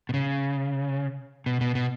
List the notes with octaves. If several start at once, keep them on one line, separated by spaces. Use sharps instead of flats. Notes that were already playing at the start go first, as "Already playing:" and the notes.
B2
C#3
B2
B2
B2